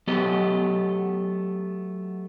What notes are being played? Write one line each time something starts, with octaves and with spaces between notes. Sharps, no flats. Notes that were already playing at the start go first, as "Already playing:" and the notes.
F#3 A3 B3 G4 D#5